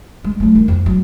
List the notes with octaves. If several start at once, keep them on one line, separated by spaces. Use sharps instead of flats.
G#3
F#3 A3
D#3 E4
F2
F#3